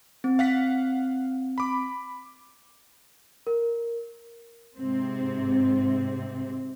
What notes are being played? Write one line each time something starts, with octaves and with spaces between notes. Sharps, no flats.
C4
F5 F#5 B6
B5 D6
A#4
G#2 C3 C4